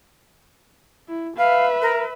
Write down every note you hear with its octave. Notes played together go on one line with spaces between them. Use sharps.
E4
B4 E5 F5
A#4